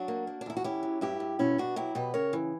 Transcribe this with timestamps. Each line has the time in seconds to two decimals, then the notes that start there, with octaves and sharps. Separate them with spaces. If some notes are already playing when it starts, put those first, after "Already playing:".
Already playing: F#3 D4 F#4
0.08 A#3
0.27 A#3
0.41 D4
0.46 E2 E4
0.57 F#4
0.64 C#4 E4 G4
0.83 F#3
1.01 G2 E4 G4
1.20 G2
1.39 B2 C#4 E4
1.58 B2 D4 F#4
1.76 F#3 E4 G4
1.95 B2 G4 B4
2.14 C#3 A#4 C#5
2.33 E3